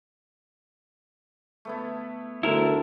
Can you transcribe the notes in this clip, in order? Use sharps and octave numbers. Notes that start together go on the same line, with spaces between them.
A3 B3 E4
D2 D3 E4 A#4